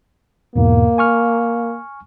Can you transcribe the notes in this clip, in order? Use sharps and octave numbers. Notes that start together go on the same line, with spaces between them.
E2 G#2 B2 A#3
G#5 C#6 F6